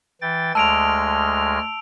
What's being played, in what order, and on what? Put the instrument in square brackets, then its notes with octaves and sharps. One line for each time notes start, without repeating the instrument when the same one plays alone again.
[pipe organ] E3 G5 A6
[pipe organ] D2 G#3 F6 [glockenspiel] A5 [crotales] E6 D7 F7